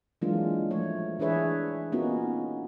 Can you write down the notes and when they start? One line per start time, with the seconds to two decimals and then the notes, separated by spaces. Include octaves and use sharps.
0.22 E3 F#3 G#3 A#3 D4 F4
0.71 F3 A3 C#5
1.19 E3 D4 G#4 B4 C#5 E5
1.92 A#3 B3 C#4 D#4 F4 F#4